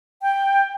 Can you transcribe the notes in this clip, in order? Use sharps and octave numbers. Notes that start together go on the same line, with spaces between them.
G5